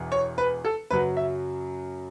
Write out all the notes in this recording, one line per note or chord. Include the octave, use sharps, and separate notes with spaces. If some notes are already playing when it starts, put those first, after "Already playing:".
Already playing: E1 E2
C#5
B4
A4
F#2 C#3 F#3 B4
E5